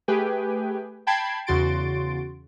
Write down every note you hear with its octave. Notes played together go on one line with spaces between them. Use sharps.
A3 G4 G#4 B4 G5 G#5
G5 A5 B5 G#6 C7
E2 C#3 F#4 C6 A6 D7